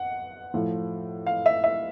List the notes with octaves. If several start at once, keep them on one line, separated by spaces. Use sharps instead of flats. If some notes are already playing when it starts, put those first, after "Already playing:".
Already playing: F#5
A2 F3
F5
E5
E5